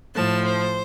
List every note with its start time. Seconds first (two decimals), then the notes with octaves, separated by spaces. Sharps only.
0.14 A2 F3 A5
0.43 C5